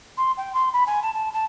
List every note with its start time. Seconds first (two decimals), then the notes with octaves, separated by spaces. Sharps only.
0.17 C6
0.37 G5
0.53 C6
0.73 B5
0.86 G#5
1.02 A5
1.13 A5
1.33 A5